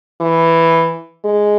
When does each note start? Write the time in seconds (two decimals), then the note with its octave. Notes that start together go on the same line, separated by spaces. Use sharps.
0.21 E3
1.24 G#3